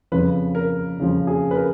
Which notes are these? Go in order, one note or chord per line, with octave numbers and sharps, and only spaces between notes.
F2 C#3 F3 B4
A#4
F2 C#3 F3
G#4
B4
A#4